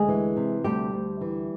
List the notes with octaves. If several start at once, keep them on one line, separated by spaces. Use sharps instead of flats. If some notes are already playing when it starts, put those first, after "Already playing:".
Already playing: D2 G#3 G#4
E3
C3
D2 G3 G4
D2
E3